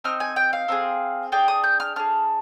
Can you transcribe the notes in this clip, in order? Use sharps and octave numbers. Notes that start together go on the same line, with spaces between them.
C4 D#4 F6
G#5
G5
F5
C4 D#4 G#4
D4 G#4 G5
D#6
G6
F6
D4 G#4 F6